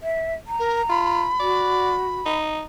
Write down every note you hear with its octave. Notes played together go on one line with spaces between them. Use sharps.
E5
A#5
A#4
F4 B5
F#4 D5
D#4